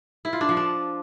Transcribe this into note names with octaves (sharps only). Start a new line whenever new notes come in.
E4
F4
D4
F3
D4